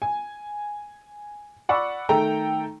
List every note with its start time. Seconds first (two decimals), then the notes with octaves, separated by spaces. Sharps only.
0.02 G#5
1.69 D5 F#5 B5 C#6 E6
2.09 D#3 A3 A4 G5 A#5